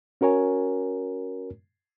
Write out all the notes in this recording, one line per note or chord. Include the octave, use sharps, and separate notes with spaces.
C#4 F#4 A#4 C#5 G#5